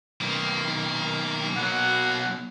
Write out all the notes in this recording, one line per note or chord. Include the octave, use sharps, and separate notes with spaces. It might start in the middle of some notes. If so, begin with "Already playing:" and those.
B1 D#3 A#3
B2 F#3 F#5